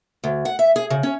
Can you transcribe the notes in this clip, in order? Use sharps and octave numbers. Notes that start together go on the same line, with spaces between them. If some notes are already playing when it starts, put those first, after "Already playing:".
D2
F#5
E5
G#4
C#3
C#4